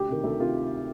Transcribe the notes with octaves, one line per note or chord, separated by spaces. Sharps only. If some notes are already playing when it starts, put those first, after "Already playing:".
Already playing: D2 G4
C3 D#3
D2 A4
C3 D#3 F4